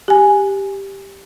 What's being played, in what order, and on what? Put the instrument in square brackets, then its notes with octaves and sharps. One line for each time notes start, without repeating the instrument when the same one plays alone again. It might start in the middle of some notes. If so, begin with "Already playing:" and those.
[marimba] G4 G#5